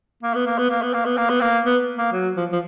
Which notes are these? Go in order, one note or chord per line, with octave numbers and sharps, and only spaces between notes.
A#3
B3
A#3
B3
A#3
B3
A#3
B3
A#3
B3
A#3
B3
A#3
F#3
F3
F3